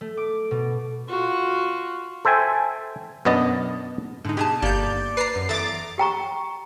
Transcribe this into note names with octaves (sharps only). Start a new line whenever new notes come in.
A3
D6
B2
F4 F#4
A4 C5 E5 G5 G#5
F#2 B2 B3 D4 D#5 A5
G#2 D3 D#4
B2 G4 G#4 A5 G#6
G1 A#3 G4 D5 A5 G6
B4 A5 A#5 C7
F#2
E2 A4 E5 A#5 D6 A6
G4 G5 A#5 C#6